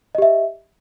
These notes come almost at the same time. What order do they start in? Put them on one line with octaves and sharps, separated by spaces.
D#5 G4 E5